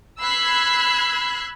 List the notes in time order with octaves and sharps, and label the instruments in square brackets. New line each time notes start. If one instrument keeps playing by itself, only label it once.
[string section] B5 E6 F#6 G#6 C7